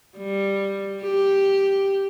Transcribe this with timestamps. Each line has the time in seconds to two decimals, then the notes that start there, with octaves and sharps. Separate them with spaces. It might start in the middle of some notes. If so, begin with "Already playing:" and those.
0.18 G3
1.03 G4